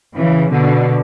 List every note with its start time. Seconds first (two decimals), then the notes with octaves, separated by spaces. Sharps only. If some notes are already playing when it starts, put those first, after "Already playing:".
0.16 C#3 E3
0.51 B2 D3